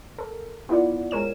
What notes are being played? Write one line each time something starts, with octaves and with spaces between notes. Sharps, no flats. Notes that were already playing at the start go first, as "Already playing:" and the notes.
A4 A#4
B3 E4 F4 D5 F#5
G#3 A#4 C#5 E7